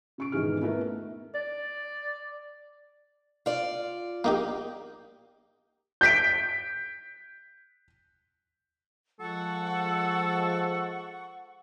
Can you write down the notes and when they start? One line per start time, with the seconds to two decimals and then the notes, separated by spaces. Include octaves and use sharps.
0.18 C#3 C#6 D7
0.32 E1 G#2 D#3 E3 G#4 F6
0.62 A3 B3 E4 A#4 E5
1.34 D5
3.46 F4 D5
4.24 A#3 D#4 G4
6.01 G6 B6 D7
9.20 F3 G#3 A4 F#5 C#6